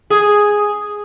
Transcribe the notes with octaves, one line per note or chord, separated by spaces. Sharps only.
G#4